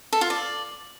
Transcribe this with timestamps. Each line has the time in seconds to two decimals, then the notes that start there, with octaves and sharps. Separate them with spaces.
0.13 A4
0.21 F4
0.30 D5